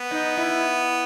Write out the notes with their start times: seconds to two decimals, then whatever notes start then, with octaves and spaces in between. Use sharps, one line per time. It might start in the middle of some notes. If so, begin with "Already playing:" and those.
Already playing: B3
0.11 D#4
0.37 E4